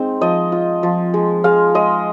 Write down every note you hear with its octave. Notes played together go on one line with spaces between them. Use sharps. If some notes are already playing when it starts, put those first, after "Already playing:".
Already playing: G#3 C4 D#4
F3 D#5
F4
F3
G#3
G#3 F5
G#3 D#5